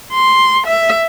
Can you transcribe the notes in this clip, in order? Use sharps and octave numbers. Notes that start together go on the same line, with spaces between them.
C6
E5